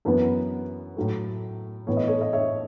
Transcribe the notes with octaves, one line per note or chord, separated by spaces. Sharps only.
F#2 E3 B3 B4
A2 F#3 A3
A2 E3 B3 C#5
D#5
A4 C#5
D#5
C#5 E5